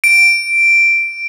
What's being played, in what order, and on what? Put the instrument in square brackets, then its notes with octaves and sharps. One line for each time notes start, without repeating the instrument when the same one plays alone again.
[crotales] D7